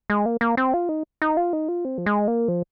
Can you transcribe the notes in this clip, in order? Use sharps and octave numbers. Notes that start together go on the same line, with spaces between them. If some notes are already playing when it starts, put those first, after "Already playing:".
G#3
A#3
A#3
C4
F4
D#4
D#4
F4
D#4
F4
C4
F3
G#3
A#3
F3